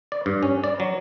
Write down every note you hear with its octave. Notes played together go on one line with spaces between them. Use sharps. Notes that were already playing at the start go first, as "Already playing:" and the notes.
D5
G2
C#4
D5
F#3